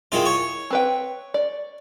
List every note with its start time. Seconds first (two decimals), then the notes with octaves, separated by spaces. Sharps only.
0.12 D#3 G#3 E4 F4
0.26 C#5
0.70 C4 B4 G5
1.34 D5